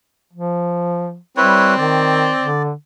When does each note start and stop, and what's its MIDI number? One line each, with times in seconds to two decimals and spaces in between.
0.33 1.17 53
1.37 1.75 55
1.37 2.47 60
1.37 1.74 64
1.37 1.74 71
1.37 1.74 73
1.78 2.32 51
1.78 2.63 74
2.40 2.72 50